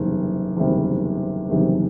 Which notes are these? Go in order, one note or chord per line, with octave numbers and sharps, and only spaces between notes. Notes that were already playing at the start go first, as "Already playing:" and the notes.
Already playing: F#1 E2 C3 D#3 G3
F#1 E2 C3 D#3 G3
F#1 E2 C3 D#3 G3